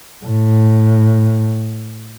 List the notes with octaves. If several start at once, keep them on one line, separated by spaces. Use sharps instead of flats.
A2